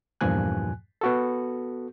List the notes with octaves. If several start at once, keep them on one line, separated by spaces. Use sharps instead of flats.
E2 G2 A#2 F3 G#5 F#6
B3 F#4 A4